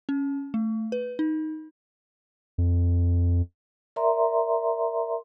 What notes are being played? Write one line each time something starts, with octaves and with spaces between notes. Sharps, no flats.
C#4
A3
B4
D#4
F2
A#4 D5 E5 A#5 C6